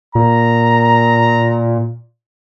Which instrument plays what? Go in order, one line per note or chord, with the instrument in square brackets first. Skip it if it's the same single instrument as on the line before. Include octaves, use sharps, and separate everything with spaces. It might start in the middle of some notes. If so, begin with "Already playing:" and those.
[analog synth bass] A#2 [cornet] A#5